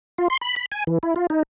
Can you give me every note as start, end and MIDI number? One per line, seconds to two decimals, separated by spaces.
0.18 0.28 65
0.30 0.37 84
0.41 0.56 83
0.56 0.66 83
0.72 0.84 80
0.87 0.98 52
1.03 1.14 64
1.16 1.27 65
1.30 1.43 63